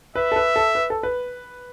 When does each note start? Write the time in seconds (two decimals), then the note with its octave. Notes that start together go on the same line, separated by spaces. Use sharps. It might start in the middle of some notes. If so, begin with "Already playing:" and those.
0.15 B4 E5
0.32 A4
0.36 B4
0.56 A4
0.75 B4
0.90 A4
1.03 B4